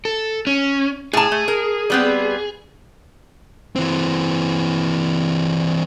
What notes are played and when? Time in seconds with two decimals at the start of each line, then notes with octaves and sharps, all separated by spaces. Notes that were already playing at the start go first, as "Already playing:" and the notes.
0.05 A4
0.47 C#4
1.13 A2 G#4 A5
1.32 A3
1.48 A#4
1.90 G3 B3 C4
3.76 E3 C4